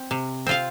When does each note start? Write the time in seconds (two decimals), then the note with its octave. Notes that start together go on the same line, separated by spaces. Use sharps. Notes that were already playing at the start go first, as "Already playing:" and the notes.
Already playing: C4
0.11 C3
0.47 C4 F4 F5